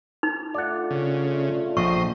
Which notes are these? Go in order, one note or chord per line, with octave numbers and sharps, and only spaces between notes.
D#4
A3 D4 F4 D5 F#5
C#3
A#1 C5 D#5 C#6